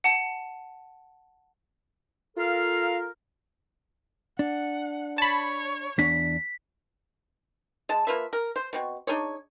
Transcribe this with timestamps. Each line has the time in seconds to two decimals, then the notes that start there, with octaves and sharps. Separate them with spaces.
0.04 F#5 A5
2.37 F4 A4 A#4 F5
4.39 D4 F#5
5.18 C#5 A5 B5
5.99 E2 D4 B6
7.89 G#3 A5
8.07 A#3 F4 B4 E5
8.33 A#4
8.56 C5
8.73 B2 C4 F#4
9.07 D4 D#4 G#4 C#5